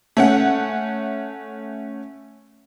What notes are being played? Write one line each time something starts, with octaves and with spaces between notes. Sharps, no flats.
A3 C#4 F#5